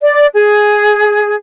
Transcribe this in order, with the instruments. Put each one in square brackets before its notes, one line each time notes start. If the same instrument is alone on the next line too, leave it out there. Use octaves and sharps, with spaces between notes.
[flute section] D5
G#4